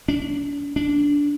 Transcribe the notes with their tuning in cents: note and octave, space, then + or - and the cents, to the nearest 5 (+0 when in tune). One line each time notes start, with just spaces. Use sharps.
D4 -45
D4 -15